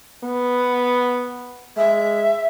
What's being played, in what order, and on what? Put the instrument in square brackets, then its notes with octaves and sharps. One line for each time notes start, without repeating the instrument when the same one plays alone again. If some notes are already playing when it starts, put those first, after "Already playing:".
[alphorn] B3
[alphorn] G#3 [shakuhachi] E5